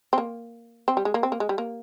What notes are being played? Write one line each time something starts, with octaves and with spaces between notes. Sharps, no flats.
C4
A#3
C4
G3
G#3
A#3
C4
A#3
G#3
G3
A#3